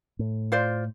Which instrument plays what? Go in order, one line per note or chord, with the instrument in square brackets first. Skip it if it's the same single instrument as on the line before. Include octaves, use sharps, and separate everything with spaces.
[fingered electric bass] A2
[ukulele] F4 C5 D5